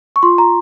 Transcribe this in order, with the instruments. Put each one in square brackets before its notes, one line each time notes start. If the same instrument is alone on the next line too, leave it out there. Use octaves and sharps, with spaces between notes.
[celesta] C#6
F4 C6
A#5